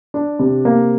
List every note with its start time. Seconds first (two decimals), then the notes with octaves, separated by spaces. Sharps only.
0.14 D4
0.39 C3
0.65 A#3